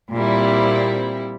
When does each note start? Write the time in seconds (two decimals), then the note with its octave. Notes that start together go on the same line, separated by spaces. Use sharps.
0.13 A#2 G3 C4 E4